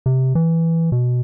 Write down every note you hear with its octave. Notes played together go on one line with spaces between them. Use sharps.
C3
E3
B2